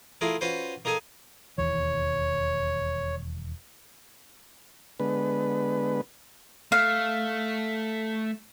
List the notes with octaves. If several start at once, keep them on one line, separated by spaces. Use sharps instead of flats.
A3 E4 F4 G#4 A#4
C#4 F4 F#4 B4 C5
A#3 D#4 G#4 A4 G#5
E1 D#2 E3 C#5
D3 G#3 B3 B4
A3 F5